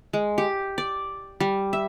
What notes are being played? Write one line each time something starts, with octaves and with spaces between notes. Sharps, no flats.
G#3
G4
D5
G3
E5